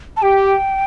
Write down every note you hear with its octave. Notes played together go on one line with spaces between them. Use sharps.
A5
G4 G5